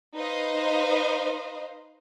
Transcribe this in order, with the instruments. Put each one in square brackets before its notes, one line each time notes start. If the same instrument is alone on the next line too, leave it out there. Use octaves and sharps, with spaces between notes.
[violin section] D#4 B4 C5 D#5 F5